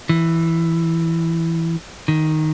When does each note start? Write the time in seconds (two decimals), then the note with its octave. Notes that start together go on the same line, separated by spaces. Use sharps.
0.09 E3
2.08 D#3